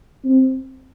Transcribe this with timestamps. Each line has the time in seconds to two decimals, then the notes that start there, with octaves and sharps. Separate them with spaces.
0.25 C4